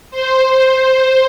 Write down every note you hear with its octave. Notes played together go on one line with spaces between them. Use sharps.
C5